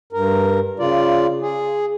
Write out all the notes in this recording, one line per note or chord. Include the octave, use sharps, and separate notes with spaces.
G2 A#4
C#3 F4 D5
G#4